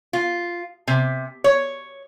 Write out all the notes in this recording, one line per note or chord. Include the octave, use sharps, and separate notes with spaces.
F4
C3
C#5